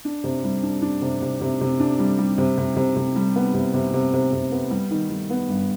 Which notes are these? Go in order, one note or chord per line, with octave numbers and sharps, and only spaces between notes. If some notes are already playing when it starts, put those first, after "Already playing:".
D4
C3
G3
D4
D4
C3
C3
C3
C3
D4
G3
G3
C3
C3
C3
C3
G3
B3
C3
C3
C3
C3
C3
B3
G3
D#3
G3
B3
G2